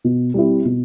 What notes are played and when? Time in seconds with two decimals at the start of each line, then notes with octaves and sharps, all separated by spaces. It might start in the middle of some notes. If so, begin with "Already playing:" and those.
0.04 B2
0.34 G3 C4 E4
0.65 B2